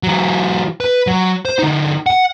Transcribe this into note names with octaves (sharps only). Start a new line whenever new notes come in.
E3 F#3
B4
F#3
C5
D3 D#4
F#5